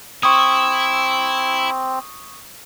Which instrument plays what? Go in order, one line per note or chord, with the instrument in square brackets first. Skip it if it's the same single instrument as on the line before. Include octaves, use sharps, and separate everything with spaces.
[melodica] C4 [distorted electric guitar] E4 [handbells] C#6 D#6